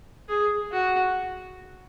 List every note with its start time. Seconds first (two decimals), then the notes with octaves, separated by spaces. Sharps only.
0.29 G#4
0.72 F#4